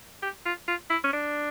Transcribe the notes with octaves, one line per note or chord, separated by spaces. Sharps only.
G4
F4
F4
E4
C#4
D4